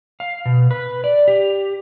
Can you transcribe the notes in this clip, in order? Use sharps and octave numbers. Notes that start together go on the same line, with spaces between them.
F5
B2
B4
D5
G4